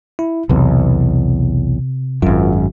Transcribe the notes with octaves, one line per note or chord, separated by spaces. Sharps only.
E4
B1 E2 C3
G#1 F#2 F4